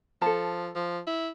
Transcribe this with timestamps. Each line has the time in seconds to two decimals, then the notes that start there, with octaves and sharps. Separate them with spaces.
0.22 F3 A4 A5
0.75 F3
1.07 E4